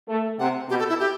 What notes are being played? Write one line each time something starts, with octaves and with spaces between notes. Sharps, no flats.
A3
C3 F#5
B2 G4
A4
E4
G4